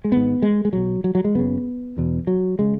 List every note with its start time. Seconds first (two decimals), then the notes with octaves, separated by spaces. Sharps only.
0.04 G#3
0.11 G#1 G#2 B3
0.42 G#3
0.65 G#3
0.73 B1 B2 F#3
1.04 F#3
1.15 F#3
1.24 G#3
1.35 F#1 F#2 C#3 B3
1.97 E1 E2 B2
2.27 F#3
2.59 C#3 G#3